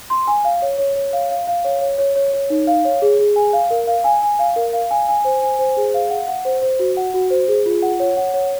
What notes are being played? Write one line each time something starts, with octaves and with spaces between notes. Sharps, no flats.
C6
G#5
F5
C#5
C#5
C#5
F5
F5
F5
C#5
C#5
C#5
C#5
C#5
D#4
F5
C#5
G#4
G#4
G#5
F5
A#4
F5
G#5
G#5
F5
A#4
F5
G#5
G#5
C5
G#5
C5
G#4
F5
F#5
F#5
C5
C5
F#4
F#5
F#4
C5
G#4
F4
F#5
C#5
F#5
C#5